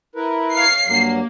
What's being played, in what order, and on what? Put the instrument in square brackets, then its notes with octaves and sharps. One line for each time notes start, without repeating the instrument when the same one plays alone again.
[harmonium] E4 A#4 B4
[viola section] C#5 F5 [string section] C7
[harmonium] G2 F#3 [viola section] A#3